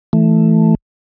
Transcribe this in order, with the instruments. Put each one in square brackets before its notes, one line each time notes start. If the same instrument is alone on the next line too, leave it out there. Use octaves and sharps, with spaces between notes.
[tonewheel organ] E3 A3